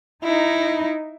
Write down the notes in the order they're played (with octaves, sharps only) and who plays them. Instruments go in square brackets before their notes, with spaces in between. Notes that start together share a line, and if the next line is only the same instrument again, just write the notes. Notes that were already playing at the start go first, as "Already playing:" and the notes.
[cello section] D#4 [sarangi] E4